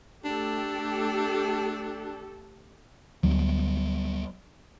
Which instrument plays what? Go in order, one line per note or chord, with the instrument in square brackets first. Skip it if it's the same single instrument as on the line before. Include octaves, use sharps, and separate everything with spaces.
[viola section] A3 G4 A4 [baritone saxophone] D4
[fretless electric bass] D2 [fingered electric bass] F#3 G3 B3